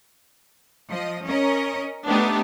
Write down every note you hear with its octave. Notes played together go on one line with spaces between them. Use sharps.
F3 D#5
C#4 A#4 D#5
A3 B3 D4 D#4 G4